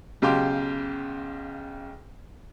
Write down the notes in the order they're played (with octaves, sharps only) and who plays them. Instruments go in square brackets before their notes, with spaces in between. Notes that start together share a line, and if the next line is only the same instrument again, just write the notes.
[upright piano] B1 C#3 G4 F5 C6 D6